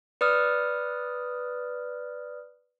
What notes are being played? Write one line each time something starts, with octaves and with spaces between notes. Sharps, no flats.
B4 D5 D#6 F6